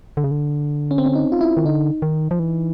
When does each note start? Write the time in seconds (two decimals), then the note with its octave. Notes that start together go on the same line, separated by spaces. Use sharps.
0.17 D3
0.24 C#3
0.31 D3
0.91 C#4
0.98 C4
1.06 C#4
1.15 D#4
1.32 F4
1.41 E4
1.57 D#3
1.65 D3 D#4
2.02 D#3
2.31 F3
2.39 E3